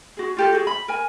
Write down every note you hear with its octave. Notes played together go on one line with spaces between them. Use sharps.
F#4 G#4
F4 G4 A4
F#4 G#4
B5
A#4 G#5